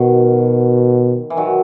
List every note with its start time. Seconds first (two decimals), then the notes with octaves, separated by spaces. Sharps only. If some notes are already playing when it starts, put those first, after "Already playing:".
Already playing: B2 D#3 F#3
1.30 E3
1.37 D#3 F#3